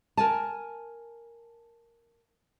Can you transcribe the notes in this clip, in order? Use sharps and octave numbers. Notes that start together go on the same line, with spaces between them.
A#4 G#5 A5